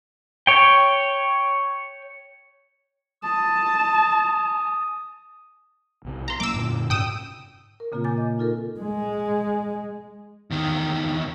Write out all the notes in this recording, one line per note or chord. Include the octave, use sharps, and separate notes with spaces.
C#5 G5
A5 D#6
B1 C3
A#5 C6
F#3 A#3 D6 E6
F#2 A#2 D3
G#2 C3 C#4 G5 D#6 E6
A#4
A#2 C#3 A#3 C4 F4
G#5 D6 G6 A6
D#5
D#4 F4 A4 A#4
G#3
E2 D#3